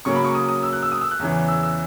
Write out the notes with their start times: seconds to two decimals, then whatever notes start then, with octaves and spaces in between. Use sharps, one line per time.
0.05 C#3 F#3 A#3 C#6
0.16 B5
0.24 C#6
0.35 D#6
0.49 D#6
0.63 E6
0.73 F#6
0.82 E6
0.92 D#6
1.01 E6
1.11 F#6
1.20 E2 C#3 E3
1.48 E6
1.63 E6